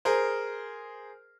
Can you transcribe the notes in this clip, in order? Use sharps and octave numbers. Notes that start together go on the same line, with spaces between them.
G#4 A#4 C5